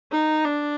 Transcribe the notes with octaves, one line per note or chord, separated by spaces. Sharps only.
D#4
D4